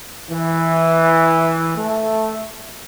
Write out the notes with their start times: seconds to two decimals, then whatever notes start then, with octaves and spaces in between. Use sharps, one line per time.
0.29 E3
1.75 A3